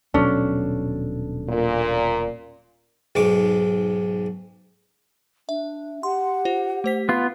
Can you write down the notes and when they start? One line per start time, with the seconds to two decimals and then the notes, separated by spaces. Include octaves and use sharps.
0.14 D#1 B2 F#3 C#4 D4 A4
1.49 A#2
3.15 B1 G#2 G#3 C#6 D6
5.49 D4 E5
6.03 G4 F#5 C6
6.45 F4 C5
6.84 A3 C5 B6
7.09 B3 F4 C7